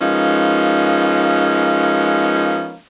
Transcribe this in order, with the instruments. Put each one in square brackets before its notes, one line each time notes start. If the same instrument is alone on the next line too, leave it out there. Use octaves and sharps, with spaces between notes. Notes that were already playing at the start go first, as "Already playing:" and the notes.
[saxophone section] F3 G#3 A#3 B3 C#4 D#4